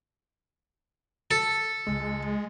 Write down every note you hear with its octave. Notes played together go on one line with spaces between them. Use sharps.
A4
C#2 G#3